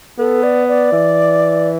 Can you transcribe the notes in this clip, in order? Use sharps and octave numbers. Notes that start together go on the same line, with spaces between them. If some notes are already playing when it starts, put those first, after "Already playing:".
B3 A4
D5
D5
E3